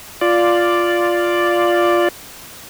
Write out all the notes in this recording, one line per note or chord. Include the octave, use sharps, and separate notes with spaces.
F4 D5